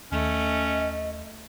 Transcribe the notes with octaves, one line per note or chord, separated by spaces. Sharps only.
D#2 A3 C#4 D#5